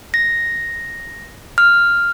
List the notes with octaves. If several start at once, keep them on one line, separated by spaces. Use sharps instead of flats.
A#6
F6